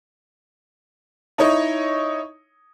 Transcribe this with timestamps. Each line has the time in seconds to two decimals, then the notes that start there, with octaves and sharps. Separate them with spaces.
1.38 D#4 E4 C#5 D#5